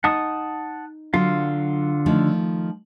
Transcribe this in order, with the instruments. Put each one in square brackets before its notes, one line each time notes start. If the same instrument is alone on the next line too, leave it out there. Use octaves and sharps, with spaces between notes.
[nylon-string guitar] D#4 [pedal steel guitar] F#5 A5 D#6
[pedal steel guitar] D3 F4 F5 [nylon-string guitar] F#3
[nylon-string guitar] D#3 F3 A3